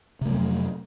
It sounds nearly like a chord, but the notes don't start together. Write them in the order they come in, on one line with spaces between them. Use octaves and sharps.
C3 A3 F#3 F2